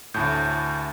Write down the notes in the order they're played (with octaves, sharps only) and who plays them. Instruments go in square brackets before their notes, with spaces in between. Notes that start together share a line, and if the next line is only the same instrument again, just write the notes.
[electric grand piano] D2 A2 [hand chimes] A5 G6